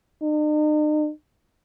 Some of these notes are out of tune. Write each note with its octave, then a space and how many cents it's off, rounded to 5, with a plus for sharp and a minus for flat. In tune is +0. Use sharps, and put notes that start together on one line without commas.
D#4 -45